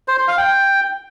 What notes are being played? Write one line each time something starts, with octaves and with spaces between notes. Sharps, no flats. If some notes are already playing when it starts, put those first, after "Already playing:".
C5
C6
F5
G5